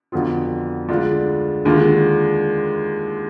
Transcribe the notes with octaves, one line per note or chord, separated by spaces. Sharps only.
F2 D3 F#3 B3 F4
D2 D3 G#3 D4 F4
D#2 D3 G#3 D4 F4